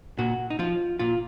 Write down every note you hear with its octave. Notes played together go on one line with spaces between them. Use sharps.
A#2 F#4
D#4
F3 F4
A#2 F4